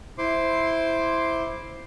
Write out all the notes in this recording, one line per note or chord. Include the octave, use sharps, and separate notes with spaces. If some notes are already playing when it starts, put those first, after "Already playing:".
E4 C5 C6 D6